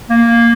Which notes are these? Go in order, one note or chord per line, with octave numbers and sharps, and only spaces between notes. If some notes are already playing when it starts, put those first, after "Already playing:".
A#3